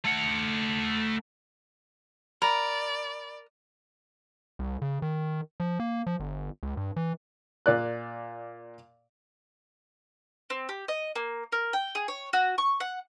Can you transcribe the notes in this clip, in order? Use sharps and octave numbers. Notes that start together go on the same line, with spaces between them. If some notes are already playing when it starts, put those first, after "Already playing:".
A3 F#5
A#4 D5 B5
C2
C#3
D#3
F3
A#3
F3
G1
C#2
G2
E3
A#2 D5 F#6
C4
G4
D#5
A#3
A#4
G5
G#4
C#5
F#4
C#6
F#5